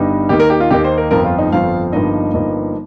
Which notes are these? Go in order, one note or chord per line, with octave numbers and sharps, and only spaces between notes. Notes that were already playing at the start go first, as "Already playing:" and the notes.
Already playing: G1 G2 G3 D#4
D#2 D#3 A#3 D#4 G4
A#4
G4
F4
D#2 D#3 A#3 D#4 G4
C5
A#4
G1 F2 F3 A#4
F4
D#4
G1 F2 F3 F5
G1 G2 F3 A#3 D#4 D#5
G1 G2 F3 A#3 D#4